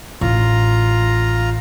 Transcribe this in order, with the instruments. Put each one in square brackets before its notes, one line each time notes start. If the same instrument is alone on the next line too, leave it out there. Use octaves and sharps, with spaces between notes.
[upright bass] A1 [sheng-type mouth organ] F4 A#5